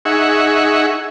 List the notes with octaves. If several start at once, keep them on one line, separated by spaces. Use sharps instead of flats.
D#4 G#4 E5 F#5 C#6